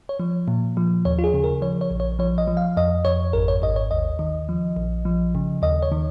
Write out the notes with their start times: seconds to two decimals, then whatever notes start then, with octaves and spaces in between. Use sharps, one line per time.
0.09 C#5
0.20 F3
0.48 A#2
0.77 F3
1.05 D#2 C#5
1.19 F4
1.24 G#4
1.34 C#3
1.44 A#4
1.62 F3 C#5
1.81 C#5
1.91 A#1
2.00 C#5
2.19 F3 C#5
2.38 D#5
2.47 F3
2.57 F5
2.77 F2 D#5
3.05 F2 C#5
3.33 G#1 A#4
3.48 C#5
3.62 G#1 D#5
3.76 C#5
3.91 D#2 D#5
4.19 D#3
4.49 F3
4.77 A#1
5.05 F3
5.35 C#3
5.62 D#2 D#5
5.82 C#5
5.92 D#3